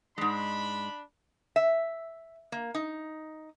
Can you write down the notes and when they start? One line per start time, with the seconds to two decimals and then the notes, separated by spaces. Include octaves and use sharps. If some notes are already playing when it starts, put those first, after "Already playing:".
0.18 G#2 G#3 D4 B5
1.56 E5
2.52 A#3
2.75 D#4